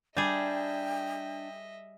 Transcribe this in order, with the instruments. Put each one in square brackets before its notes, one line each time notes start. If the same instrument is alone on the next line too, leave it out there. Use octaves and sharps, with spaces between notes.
[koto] G3 G#4 [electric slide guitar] D4 [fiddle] D#5 E5 [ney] G5